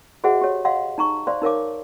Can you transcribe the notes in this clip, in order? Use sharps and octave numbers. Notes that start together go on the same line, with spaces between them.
F#4 G#4 C5 D#5 E5 F#5
G4 C#5
D#5 F5 F#5 C6
D#4 A#5 C#6
C5 D5 F5 C6
D#4 A#4 C#5 F5 D6